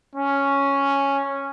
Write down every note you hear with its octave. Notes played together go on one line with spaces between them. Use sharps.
C#4